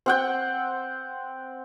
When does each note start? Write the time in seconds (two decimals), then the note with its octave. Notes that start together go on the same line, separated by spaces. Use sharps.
0.06 C4 F#5 G5